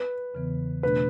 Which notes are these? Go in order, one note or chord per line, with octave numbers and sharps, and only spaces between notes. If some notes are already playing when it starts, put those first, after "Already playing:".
Already playing: B4
E2 C#3 E3 B3
B2 A3 D4 B4